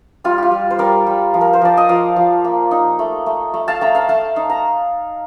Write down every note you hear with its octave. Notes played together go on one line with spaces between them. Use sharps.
G3 F4
F4 G4
G3
C5
G3 A#4 D5
G3
F3
A#4
C5
F3 D5
D#5
F3 D5 F5
F3
A#3
D#4
A3
A3
A3
F5 A5
A3 G5 A#5
F5 A5
A3 F5 A5
D#4
A#5